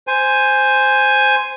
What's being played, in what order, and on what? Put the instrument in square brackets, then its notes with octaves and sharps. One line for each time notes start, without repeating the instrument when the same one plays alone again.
[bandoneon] C5 G#5